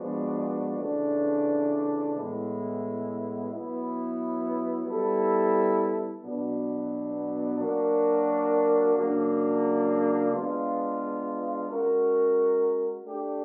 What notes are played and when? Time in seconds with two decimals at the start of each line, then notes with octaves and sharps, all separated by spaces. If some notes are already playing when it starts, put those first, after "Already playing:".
Already playing: F3 G#3 B3 D4 F#4
0.78 C#3 E3 A3 D4
2.14 A2 E3 G#3 B3 E4
3.50 F#3 B3 E4
4.87 G3 B3 E4 A4
6.23 B2 F#3 B3 D4
7.58 F#3 A#3 D4 F#4 A#4
8.95 C#3 F#3 A#3 D4
10.31 G#3 B3 D4 F4
11.67 G#3 C#4 F#4 A#4
13.03 A3 D4 G4